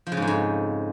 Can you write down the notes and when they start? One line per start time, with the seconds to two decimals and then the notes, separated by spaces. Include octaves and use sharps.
0.07 F3
0.12 C#3
0.17 G#2
0.22 F2
0.27 G#2